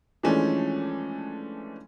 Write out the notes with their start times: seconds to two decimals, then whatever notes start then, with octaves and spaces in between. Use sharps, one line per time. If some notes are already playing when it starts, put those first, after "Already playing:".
0.23 E3 F3 G#3 A3 C#4 D4